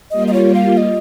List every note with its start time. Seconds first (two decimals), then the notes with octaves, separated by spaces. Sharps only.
0.11 G3 A#3 F4 D#5
0.28 D#5
0.33 C#5
0.55 F5
0.77 D#5